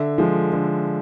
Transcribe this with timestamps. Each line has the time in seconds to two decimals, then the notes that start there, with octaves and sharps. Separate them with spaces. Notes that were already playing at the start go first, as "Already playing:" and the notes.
Already playing: D3 E5
0.18 F3 G#3
0.53 D3